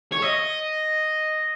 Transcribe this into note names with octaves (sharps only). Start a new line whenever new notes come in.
C#5
D#5